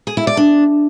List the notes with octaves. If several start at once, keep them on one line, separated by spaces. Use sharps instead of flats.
G#4
E4
D5
D4